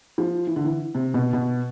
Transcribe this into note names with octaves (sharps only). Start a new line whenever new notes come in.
F3
E3
D3
E3
C3
B2
B2